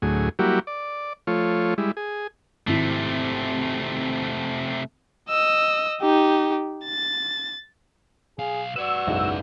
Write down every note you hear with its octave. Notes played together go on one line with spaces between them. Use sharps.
D2 A2 F#3 G#4
F#3 G3 A#3 E4 F#4 G4
D5
F3 A3 F4 C#5
G3 G#3 E4
G#4
G#1 C3 A3 E4
D#5 E6
D#4 G4
A6
B1 G#4 F5
F#4 B4 D5 E6
F#1 B1 G#2